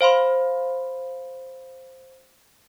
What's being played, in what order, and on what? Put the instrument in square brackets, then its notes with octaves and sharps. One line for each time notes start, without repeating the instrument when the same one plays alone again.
[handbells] C5 F5 B5 C6